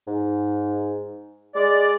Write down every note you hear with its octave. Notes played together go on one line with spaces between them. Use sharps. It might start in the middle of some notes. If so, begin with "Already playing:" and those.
G#2
G#3 D5